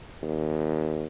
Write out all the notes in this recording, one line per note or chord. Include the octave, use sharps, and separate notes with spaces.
D#2